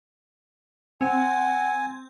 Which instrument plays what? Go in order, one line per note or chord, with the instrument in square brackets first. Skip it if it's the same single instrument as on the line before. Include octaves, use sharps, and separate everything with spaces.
[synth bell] C4 [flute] F#5 [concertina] G#5